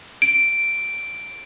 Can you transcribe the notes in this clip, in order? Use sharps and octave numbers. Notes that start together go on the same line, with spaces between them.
D7